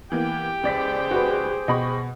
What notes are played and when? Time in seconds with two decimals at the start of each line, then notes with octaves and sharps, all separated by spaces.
0.12 E3 A#3 B3 G4 G5
0.63 C#2 G#4 C5 D5 B6
1.11 F#4 B4
1.68 B2 D#5 B5 C#6